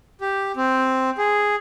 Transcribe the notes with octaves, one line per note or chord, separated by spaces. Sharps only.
G4
C4
G#4